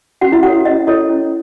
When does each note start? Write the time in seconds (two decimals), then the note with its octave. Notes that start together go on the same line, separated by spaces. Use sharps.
0.21 C#4 F#4 F#5
0.32 E4 E5
0.43 E4 F#4 A4 C#5 F#5
0.65 C#4 D#5
0.87 E4 A4 C#5 D#5
1.09 C#4